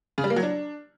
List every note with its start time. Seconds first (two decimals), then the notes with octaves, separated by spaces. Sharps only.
0.18 C#3
0.24 G3
0.30 A#3
0.36 F#3
0.43 D4